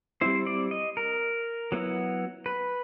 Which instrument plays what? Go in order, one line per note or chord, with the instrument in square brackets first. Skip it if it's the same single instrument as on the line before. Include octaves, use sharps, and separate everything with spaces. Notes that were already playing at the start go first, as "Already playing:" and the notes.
[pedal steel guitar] G3 C4 E4 C5
D5
D#5
A#4
F#3 B3 E4
B4